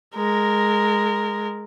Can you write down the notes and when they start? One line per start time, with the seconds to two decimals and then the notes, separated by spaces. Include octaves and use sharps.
0.15 G#3 A#4